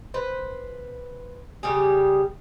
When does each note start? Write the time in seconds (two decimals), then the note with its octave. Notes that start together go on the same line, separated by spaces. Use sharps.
0.14 B4 C5
1.63 C#3 G3 G4 G#4